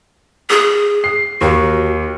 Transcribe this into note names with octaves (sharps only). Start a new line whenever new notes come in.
G#4
C7
D#2 F#4